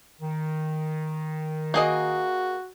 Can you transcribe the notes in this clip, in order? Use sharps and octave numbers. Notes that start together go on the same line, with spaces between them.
D#3
A#3 F#4 G#4 D#5